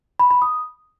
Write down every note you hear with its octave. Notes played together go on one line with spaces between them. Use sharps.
B5
B5
D#6